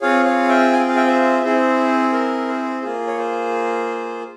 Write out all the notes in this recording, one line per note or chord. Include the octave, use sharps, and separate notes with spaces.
C4 F4 G#4 C#5 F5
C#5 F5
E5 G5
G#5
G5
F5
E5 G5
C5 E5
C4 E4 G#4 C5
A#4
C5
A#3 F4 G#4
C#5
C5